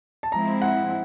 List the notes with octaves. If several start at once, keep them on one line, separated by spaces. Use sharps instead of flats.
A5
F3 G#3 C4 E4 A#5
F#5